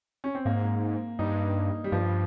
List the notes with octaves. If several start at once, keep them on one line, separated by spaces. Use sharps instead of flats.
C#4
C4
G#2 A#3
G2 D#4
G3
G2 F3